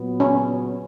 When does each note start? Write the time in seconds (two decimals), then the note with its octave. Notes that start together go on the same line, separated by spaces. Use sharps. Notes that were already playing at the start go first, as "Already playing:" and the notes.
Already playing: A#2 F#3 B3
0.20 C#4